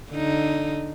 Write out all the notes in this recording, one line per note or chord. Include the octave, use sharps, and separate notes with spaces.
D3 D#4